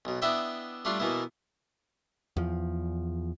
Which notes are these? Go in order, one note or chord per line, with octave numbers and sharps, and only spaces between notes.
B1 B2
B3 D4 E4 D#5 E5 G5
G3 A3 D4 F4 F5
B2 E3 A#3 B3 E4
E2 F3